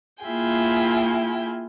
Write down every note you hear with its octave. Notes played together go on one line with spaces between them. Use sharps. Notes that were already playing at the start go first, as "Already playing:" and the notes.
A#3 E4 F4 G#4 G5